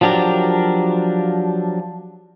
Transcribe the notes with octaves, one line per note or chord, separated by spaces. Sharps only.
F3 F#3 D4 G4 A#4